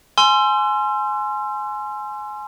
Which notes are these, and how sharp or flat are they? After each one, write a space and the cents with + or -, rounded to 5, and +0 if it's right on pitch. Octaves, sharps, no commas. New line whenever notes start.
G#5 +20 C6 +0 E6 +45